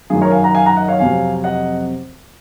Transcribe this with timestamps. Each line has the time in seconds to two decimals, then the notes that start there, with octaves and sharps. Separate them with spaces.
0.10 F#2 D#3 F#3 F4 G#4
0.22 A#4 C#5
0.32 F5 G#5
0.43 F#5 A#5
0.55 F5 G#5
0.66 F#5 A#5
0.77 D#5 F#5
0.88 C#5 F5
0.99 F2 C3 F#3 F5 G#5
1.44 D#5 F#5